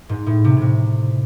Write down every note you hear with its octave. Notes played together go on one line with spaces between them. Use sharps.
G#2
A2
C3
A2 C3